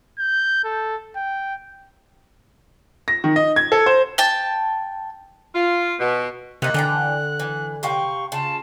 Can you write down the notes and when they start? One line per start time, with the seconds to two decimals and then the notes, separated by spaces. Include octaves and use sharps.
0.19 G6
0.64 A4
1.16 G5
3.08 A#6
3.24 D#3
3.36 D#5
3.56 G#6
3.72 A4
3.86 C5
4.18 G5 A5
5.54 F4
5.99 B2
6.62 C3 A#3 D#4 F#6
6.74 D3 E3 G5 A#5
7.40 E3
7.83 C3 F5 G5 C#6
8.32 C#3 F4 A5